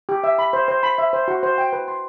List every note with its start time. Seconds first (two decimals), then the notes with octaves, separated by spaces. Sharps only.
0.09 G4
0.24 E5
0.39 B5
0.53 C5
0.68 C5
0.83 B5
0.98 E5
1.13 C5
1.28 F#4
1.43 C5
1.58 G5
1.73 B4
1.88 C6